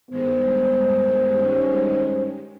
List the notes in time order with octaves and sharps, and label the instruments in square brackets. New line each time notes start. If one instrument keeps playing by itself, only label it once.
[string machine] G2 D#3 G#3 [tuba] B3 [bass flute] C5
[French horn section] C#4 D#4 G4